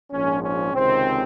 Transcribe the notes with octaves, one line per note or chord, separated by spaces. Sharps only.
A#1 G#2 F3 C#4
C#4
C#2 C3 D#3 C4